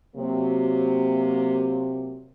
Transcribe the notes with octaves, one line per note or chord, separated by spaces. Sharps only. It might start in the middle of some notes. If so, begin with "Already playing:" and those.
C3 F#3 A#3